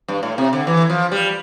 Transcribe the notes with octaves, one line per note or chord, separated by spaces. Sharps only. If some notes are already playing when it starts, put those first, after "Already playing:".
G2
A2
C3
D3
E3
F3
G3